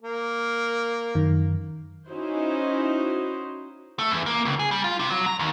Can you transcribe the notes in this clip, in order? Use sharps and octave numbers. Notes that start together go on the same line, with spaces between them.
A#3
F#2 D#3
C#4 D#4 E4 F#4 C5
A3
E2
A#3
C#2
G#4
G3
F4
C3
F#3
A#5
D#2